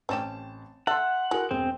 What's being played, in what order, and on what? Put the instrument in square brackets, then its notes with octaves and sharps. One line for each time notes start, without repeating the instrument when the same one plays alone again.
[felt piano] A1 A5 E7 [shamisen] C4 C#4 G4
[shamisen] A4 [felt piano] E5 C6 [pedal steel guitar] F#5
[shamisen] G#3 [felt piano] E4 F#4 A#4
[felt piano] E1 G#4 [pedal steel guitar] C4